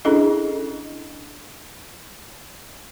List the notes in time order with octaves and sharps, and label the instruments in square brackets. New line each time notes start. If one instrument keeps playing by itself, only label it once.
[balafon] C#4 D4 E4 G#4 A4 D#5